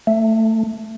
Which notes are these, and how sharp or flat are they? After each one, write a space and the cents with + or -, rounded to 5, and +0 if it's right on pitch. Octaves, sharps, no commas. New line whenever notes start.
A3 +15